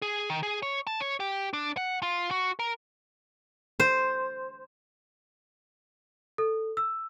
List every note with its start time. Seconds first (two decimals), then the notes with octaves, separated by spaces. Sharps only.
0.02 G#4
0.30 D#3
0.43 G#4
0.62 C#5
0.87 A5
1.00 C#5
1.20 G4
1.53 D4
1.77 F#5
2.03 F4
2.31 F#4
2.59 A#4
3.80 C5
6.38 A4
6.77 E6